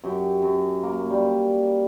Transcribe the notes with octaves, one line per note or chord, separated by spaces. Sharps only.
F#2 G4
F#2
A#3
G3